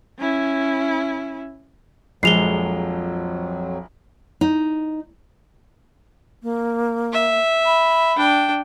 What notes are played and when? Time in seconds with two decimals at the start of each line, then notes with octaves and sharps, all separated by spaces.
0.18 C#4 E4
2.23 A#1 F2 F3 F#3 G#3 C7 F7 G7
4.41 D#4
6.43 A#3
7.12 E5
7.66 B5
8.16 D4 G5